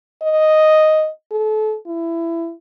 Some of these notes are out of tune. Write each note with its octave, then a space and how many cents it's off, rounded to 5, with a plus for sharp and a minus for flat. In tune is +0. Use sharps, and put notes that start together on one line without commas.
D#5 +0
A4 -30
E4 +20